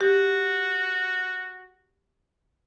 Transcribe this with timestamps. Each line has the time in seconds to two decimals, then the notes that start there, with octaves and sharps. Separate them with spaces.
0.01 F#4 G4